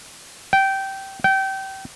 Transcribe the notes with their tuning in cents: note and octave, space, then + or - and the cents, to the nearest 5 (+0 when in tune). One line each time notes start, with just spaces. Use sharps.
G5 -15
G5 -25